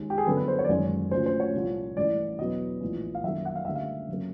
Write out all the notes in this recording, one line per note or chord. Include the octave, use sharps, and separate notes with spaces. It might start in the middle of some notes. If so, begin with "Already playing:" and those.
Already playing: D#2 D#3 G#3
G4
G#4
G2 D3 F#3 B3 A4
B4
C5
C#5
D5
F#1 F#2 D#3 G#3 C#5
D2 C#3 F3 C5
C5
C#5
C2 A#2 F3
A1 G2 E3 D5
E2 B2 F#3 B3 D#5
A#1 A2 E3
F5
F#2 D#3 G3 A#3 E5
F#5
F5
D2 D3 G3 A#3 E5
F5
F#2 C#3 F#3 A#3